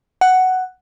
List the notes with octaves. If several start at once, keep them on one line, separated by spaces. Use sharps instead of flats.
F#5